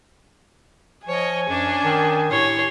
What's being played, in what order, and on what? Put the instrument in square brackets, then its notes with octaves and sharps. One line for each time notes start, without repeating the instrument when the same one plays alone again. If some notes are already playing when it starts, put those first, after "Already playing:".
[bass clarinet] F3 [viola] C#5 D#5 [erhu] G#5
[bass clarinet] F#2 [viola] C#4 D4
[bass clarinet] D#3
[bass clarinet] A2 [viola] G4 C6 [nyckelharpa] C#5